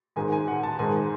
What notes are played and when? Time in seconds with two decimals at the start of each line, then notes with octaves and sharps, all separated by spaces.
0.16 G#2 D#3 G#3 G#5
0.32 G#5
0.48 F#5
0.63 A5
0.79 G#2 D#3 G#3 G#5